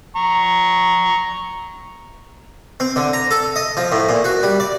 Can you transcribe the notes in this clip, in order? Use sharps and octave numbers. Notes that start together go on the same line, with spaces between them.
A#5 C#6
C4
D3
A#5
A4
D#5
F3
A2
A#2
F#4
G3
D5